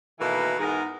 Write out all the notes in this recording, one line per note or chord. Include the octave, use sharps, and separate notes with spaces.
B2 D#3 E3 A3 A#3
G#2 E3 B3 G#4 A#4